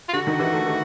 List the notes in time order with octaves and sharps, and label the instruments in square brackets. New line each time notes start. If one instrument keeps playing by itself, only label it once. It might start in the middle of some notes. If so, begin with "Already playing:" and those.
[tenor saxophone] F4
[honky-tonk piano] D3 [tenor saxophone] F#4
[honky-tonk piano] D#3
E3
A3
A3